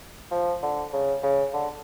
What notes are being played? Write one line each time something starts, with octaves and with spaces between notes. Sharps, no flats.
F3
D3
C#3
C#3
D3